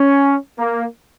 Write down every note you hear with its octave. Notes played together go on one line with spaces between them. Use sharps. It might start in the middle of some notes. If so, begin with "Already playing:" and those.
Already playing: C#4
A#3